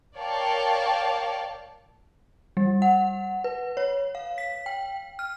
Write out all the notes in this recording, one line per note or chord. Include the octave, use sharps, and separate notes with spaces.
A#4 C#5 D5 F5 G5 A5
G3
F#5
B4
C#5
F5
B6
G5
F6